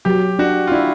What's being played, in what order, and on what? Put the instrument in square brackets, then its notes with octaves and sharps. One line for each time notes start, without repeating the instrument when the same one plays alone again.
[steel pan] F#3 [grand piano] G4
[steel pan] D4 [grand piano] F#4
[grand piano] F4
[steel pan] D4 [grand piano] E4